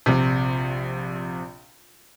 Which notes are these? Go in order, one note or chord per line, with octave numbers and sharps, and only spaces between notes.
A#1 C3